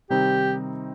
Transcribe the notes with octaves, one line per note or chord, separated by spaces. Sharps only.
C3 D#3 G3 C4 D#4 G4